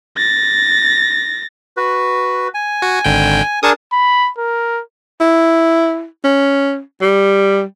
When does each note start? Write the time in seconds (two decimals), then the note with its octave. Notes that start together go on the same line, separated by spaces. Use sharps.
0.17 A6 A#6
1.77 F#4 B4
2.54 G#5
2.82 F#4
3.05 G#1 D3 G5
3.63 D4 G#4 A#4 A5 C#6 D#6
3.92 B5
4.38 A#4
5.20 E4
6.24 C#4
7.02 G3